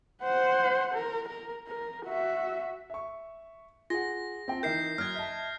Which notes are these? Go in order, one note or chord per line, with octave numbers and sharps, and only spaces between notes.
C5 F#5
A#4
A#4
A#4
F#4 E5
E5 C#6
F4 G#4 F#5 A#6
C4 G5 A5
E3 D#4 E4 A#4 G6 C7
F#2 D#6 F6 F#6 G#6
D#5 E5 A5